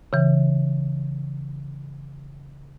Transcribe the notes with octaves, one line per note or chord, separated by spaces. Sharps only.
C#3 E3